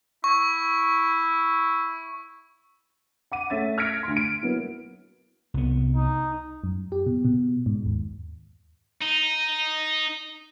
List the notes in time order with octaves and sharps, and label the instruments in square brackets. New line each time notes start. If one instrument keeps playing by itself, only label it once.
[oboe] E4 [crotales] C#6
[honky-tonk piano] F#5 D6 D#7
A3 C#4 E5 A6
F6 G#6 A#6 B6 C#7 D7
D2 C6
D7
F#3 A#3 B3 E4
[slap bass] C2 B3
[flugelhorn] D#4
[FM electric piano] F#2
G4
B2
B2
G#2
D#2
[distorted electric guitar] D#4